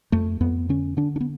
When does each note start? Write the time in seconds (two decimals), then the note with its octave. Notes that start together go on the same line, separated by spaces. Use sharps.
0.12 F2 A3
0.41 F2 B3
0.69 D3 C#4
0.97 D3 D4
1.16 D4
1.21 B3